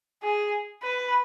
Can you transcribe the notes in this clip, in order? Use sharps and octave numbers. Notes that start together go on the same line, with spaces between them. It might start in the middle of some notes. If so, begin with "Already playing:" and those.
G#4
B4